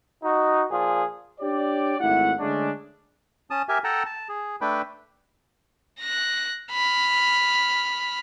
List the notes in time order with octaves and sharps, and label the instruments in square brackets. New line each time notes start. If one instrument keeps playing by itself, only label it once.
[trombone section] D#4 F#4
A#2 F3 F4 G#4
[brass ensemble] D4 G4 C#5 D5
G#1 A3 E4 F#5
D3 G#3 A3 C#4 D4
[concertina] C#4 A5 D#6
G4 A#4 E5 G#5
A4 F#5 G5 A5 A#5
A5
G#4
A3 D4 B4 G5 B5
[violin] F#6 A#6
B5 F6